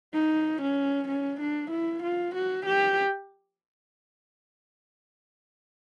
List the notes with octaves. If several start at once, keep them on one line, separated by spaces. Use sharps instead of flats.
D#4
C#4
C#4
D4
E4
F4
F#4
G4